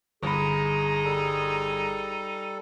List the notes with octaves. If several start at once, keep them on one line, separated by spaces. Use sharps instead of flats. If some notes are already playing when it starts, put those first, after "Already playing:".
G1 D#4 G#4 B5
G3 A4